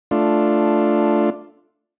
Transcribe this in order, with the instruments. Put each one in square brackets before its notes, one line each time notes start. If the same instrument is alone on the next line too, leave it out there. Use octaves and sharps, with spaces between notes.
[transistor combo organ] A3 D4 F4